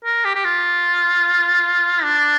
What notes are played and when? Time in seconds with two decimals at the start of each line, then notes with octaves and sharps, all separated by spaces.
0.04 A#4
0.25 G4
0.35 G4
0.44 F4
2.03 D4